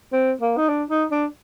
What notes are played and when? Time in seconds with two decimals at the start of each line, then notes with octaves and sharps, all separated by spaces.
0.13 C4
0.41 A#3
0.57 D#4
0.69 D4
0.90 D#4
1.11 D4